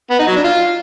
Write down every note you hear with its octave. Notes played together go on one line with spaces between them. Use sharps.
B3
D#4
F#3
D4
F4